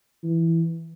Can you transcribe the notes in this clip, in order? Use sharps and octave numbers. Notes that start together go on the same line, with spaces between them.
E3